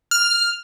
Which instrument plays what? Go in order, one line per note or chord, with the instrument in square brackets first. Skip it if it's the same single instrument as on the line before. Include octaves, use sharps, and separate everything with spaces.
[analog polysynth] F6